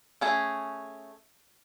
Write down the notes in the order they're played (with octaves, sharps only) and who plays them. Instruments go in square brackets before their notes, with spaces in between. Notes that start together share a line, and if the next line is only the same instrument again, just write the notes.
[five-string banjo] A3 C#4 G#4